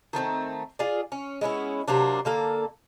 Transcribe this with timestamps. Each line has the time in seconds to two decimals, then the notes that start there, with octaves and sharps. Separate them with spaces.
0.13 D#3 A3 B3 C4
0.79 F4 G#4 D5
1.12 C#4
1.41 G#3 B3 C#4 E4
1.88 C3 F#3 A#3 D4
2.25 D3 A#3 A4